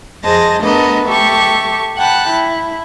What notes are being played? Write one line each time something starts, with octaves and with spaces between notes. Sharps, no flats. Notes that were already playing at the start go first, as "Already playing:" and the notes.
F2 G#4 C5 D#5 A5 A#6
A3 B3 D4 A4 A#4 D#5
G4 A4 E5 C#6
F#5 G5 A5 B5 F#6
E4